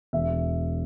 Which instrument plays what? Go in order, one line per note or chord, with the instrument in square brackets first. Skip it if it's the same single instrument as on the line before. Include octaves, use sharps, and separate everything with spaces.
[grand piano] E1 E5